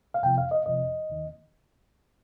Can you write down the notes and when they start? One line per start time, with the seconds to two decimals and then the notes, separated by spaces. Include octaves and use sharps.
0.14 F5
0.23 F2 C3 F3 G5
0.38 F5
0.51 D#5
0.66 F2 C3 F3 D#5
1.10 D#2 D#3